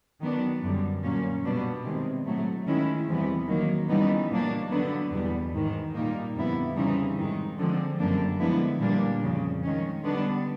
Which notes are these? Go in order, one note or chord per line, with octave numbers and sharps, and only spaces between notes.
D#3 F#3 B3 D4
F#2 D3 G3
A#2 F#3 A#3 C#4
B2 G3 B3 D4
C3 D#3 G#3
A2 F#3 A3
D#3 G#3 C#4 E4
E2 C3 E3 G3 B3
D#3 F#3 A#3
C#3 E3 G3 B3 D#4
A#2 F#3 A#3 D4
D3 F#3 B3 D4
E2 B2 G3 B3
G#2 D#3 G#3
A#2 G3 A#3 D#4
F2 D3 G3 B3 E4
C#3 E3 G3 C4 D#4
G#2 D#3 G#3
D3 F3 G#3 C4
F#2 D3 G3 A#3 D4
D3 F3 G#3 B3 E4
A#2 G3 A#3 D4
F2 C#3 F3
D#3 G#3 C#4
D3 G3 B3 D4